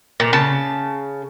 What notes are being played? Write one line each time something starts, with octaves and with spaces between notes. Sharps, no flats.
A#2
C#3 A5